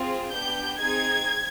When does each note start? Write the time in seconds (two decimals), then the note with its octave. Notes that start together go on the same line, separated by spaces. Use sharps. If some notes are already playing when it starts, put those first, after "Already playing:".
Already playing: C4 F4 G#4
0.31 B3 D4 G4 G6
0.79 C4 D#4 G#4 G#6